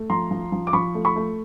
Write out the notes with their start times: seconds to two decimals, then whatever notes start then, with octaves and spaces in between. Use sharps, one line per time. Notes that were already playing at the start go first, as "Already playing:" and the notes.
Already playing: A3
0.10 F3 A#5 C6
0.31 F3
0.52 F3
0.67 D6
0.73 F3 B5 C#6
0.95 A3
1.05 B5 C#6
1.16 A3